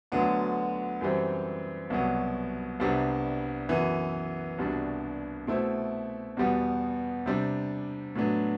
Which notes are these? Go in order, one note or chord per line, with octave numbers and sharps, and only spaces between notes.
D2 D3 F#3 B3 D4
F#2 E3 G3 C4
C2 B2 F#3 B3
C2 C3 G3 B3 D4
F#2 E3 B3
C2 B2 G3 D4
B2 A3 C4 E4
E2 B2 G3 B3
C3 G3 D4
A2 F#3 B3 D4